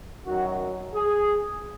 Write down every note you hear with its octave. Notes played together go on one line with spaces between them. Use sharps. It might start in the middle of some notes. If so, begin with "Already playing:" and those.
F#2 D#3 F#3 F#4
G#4